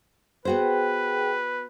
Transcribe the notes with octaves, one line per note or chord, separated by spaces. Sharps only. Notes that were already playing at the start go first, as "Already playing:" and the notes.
B3 F#4 G#4 B4 C5 G5